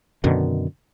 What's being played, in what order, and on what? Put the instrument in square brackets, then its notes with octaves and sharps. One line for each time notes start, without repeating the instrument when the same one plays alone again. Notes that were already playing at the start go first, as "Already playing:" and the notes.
[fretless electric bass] F#2 B2 D3 D#3